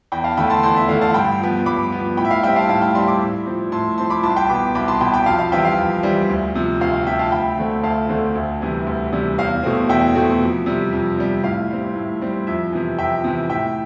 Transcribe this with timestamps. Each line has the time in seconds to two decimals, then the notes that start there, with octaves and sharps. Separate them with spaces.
0.12 E2 G5 B5
0.24 F5 A5
0.37 D3 A3 G5 B5
0.50 A5 C6
0.63 E2 A5 C6
0.76 E5
0.88 D3 A3 F5
1.02 F5 A5
1.14 G2 G5 B5
1.40 F3 B3
1.66 G2 B5 D6
1.92 F3 B3
2.17 A2 G5 B5
2.25 E5
2.31 F5
2.43 G3 C4 E5 G5
2.56 F5 A5
2.69 A2 F5 A5
2.82 G5 B5
2.95 G3 C4 A5 C6
3.08 B5 D6
3.21 A2
3.46 F3 C4
3.72 A2 A5 C6
3.97 F3 C4 A5 C6
4.10 B5 D6
4.23 C2 A5 C6
4.36 G5 B5
4.49 B2 B3 B5 D6
4.75 C2 B5 D6
4.88 A5 C6
5.01 B2 B3 G5 B5
5.14 G5 B5
5.26 F2 F5 A5
5.39 F5
5.52 E3 G3 C4 E5 G5
5.65 F5
5.78 F2
6.03 E3 G3 C4
6.29 D2
6.55 C3 F3
6.81 D2 F5
6.94 F5
7.07 C3 F3 E5 G5
7.19 F5 A5
7.32 D2 G5 B5
7.58 D3 A3 C4
7.83 D2 F5 A5
8.09 D3 A3 C4
8.35 D2
8.61 C3 E3 G3
8.87 D2
9.13 C3 E3 G3
9.38 E2 F5
9.63 B2 A3 C4
9.89 E2 E5 G5
10.15 B2 A3 C4
10.42 F2
10.66 C3 G3
10.93 F2
11.18 C3 G3
11.43 A2 F5
11.70 G3 C4
11.96 A2
12.22 G3 C4
12.47 F2 E5
12.73 C3 E3
12.98 F2 E5 G5
13.24 C3 E3
13.50 A2 E5 G5